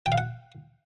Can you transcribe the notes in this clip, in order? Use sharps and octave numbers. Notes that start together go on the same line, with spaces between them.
G5
F5
F#5